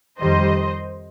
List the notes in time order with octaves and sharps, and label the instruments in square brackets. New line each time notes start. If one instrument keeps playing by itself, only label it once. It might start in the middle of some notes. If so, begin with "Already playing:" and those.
[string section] F2 D#3 G3 C5 D#5